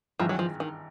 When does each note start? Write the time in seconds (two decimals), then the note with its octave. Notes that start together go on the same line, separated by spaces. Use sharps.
0.19 G#1 G2 E3 F3
0.29 F#3
0.39 F3
0.60 D#3